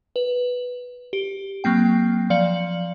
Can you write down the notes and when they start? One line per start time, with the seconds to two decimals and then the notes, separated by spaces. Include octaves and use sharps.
0.16 B4
1.13 G4
1.64 F#3 A#3 C4 G5
2.30 F3 D5 F5 C#7 F#7